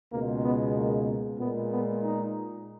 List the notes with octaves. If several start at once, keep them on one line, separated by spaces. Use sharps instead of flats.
C#2 B2 G#3 A#3
B3
A#3
A#2 G#3 B3
B3
D#4